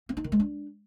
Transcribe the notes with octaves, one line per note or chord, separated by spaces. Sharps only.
C4
D#4
D#3
G#3
D4